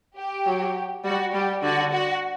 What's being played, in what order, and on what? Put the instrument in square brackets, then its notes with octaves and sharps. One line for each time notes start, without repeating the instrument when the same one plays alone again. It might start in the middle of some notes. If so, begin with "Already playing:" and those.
[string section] G4
[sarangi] F#3
[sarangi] G3 [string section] F#4
[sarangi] G3 [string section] G4
[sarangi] D3 [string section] F#4
[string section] F#4